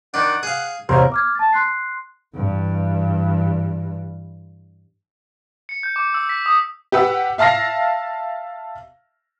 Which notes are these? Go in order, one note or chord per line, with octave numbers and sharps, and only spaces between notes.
D#3 D4 F#5
G#4 F5
A1 E2 C3 A#4 C5 C#5
D6 F6 G#6
A5 A6
C6 F#6 C7
G2 E3
C#7
G6
D6
E6
B6
D#6
G4 B4 F#5 E6
E5 F5 A5 F6 A#6 C7